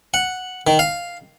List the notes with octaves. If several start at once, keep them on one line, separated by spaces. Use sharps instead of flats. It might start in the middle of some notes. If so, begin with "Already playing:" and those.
F#5
D#3
F5